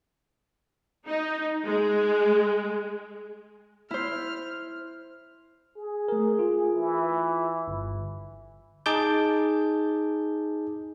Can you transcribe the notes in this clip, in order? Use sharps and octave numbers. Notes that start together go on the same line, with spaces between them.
D#4
G#3
E4 C5 F6
G#4
A3 A#4
F4
E3
G1
D#4 G#4 A5 D6 G6